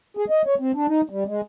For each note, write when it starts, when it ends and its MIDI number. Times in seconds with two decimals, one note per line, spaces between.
0.17 0.25 68
0.30 0.42 75
0.46 0.55 73
0.59 0.71 60
0.74 0.87 62
0.88 1.01 63
1.10 1.24 55
1.27 1.41 56